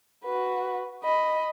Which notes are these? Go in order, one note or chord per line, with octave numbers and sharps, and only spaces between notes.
F#4 B4
D#5 B5